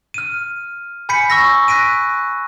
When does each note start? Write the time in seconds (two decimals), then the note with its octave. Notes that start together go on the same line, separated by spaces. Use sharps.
0.14 F6 D#7
1.09 G#5 B5 G6 B6 C#7
1.30 C#6 E6 A#6
1.68 F#6 A#6 B6 D7 D#7